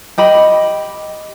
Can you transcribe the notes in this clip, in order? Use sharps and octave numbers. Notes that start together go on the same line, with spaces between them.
G4 D#5 B5